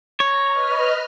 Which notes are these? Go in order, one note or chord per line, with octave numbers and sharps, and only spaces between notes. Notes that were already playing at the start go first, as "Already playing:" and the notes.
C#5 A#5
B4 D#5 F6